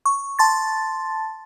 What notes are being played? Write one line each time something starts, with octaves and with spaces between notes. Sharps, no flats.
C#6
A5 C6 A6